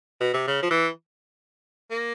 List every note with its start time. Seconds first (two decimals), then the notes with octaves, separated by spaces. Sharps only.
0.21 B2
0.34 C3
0.48 C#3
0.63 F3
0.71 E3
1.91 A#3